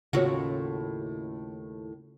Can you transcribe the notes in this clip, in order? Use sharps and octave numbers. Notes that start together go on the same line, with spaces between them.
D#2 A2 C#3 F4 F#4 C#5